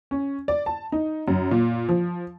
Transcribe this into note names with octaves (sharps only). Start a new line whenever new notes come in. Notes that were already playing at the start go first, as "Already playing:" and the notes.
C#4
D5
A5
D#4
F#2
A#2
F3